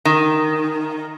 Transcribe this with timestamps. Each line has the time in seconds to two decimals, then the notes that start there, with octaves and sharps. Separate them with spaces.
0.05 D#3